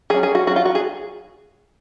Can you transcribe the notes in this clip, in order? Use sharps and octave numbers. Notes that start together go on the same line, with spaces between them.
F#3 C#4 G#4
G#4
F#4
F#3 C#4 F#4
F4
F#4
G#4